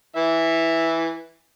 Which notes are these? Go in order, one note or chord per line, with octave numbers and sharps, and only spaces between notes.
E3 E5